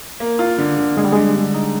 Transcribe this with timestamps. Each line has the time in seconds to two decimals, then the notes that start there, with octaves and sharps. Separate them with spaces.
0.20 A#3
0.39 F4
0.58 D3
0.78 D3
0.97 D3 G#3
1.05 G3
1.12 D3 G#3
1.36 D3
1.54 D#4